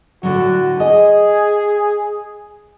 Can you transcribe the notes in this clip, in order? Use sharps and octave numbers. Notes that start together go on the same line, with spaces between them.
A2 D3 F#3 F#4
G#4 D#5